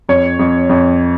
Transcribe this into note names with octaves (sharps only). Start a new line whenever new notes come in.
F2 C#5
F2
F2